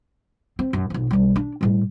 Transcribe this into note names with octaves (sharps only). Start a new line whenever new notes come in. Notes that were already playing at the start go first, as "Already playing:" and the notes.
C4
F#2
B1 F2
B1 G3
D4
A2 G3